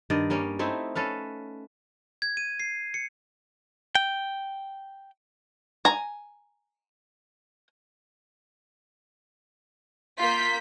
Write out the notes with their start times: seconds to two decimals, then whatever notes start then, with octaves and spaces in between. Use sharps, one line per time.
0.10 G2 D#3 D5 D#5
0.30 G3 A#3 C#4
0.59 A3 C4 D#4 E4
0.95 C#4 A4 B4 F5
2.22 G#6
2.37 D#7
2.60 C7
2.94 C#7
3.95 G5
5.85 G#5 A#5
10.18 A#3 F4 G6 B6